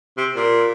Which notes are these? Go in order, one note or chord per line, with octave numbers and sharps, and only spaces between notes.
C3
A#2